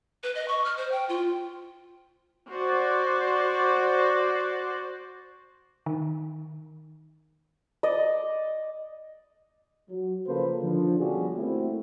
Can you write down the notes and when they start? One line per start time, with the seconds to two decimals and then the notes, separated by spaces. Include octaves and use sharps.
0.23 B4
0.35 D#5
0.48 C#6
0.64 F6
0.77 C5
0.91 G5
1.09 F4
2.50 F#4 C5 D5
5.86 D#3
7.83 D5 D#5
9.90 F#3
10.27 C#3 F3 A#3 A4 B4 C5
10.61 D3 D#3 F3
10.99 B2 F3 G3 C#4 F#4 G#4
11.38 A3 A#3 C4 E4 F#4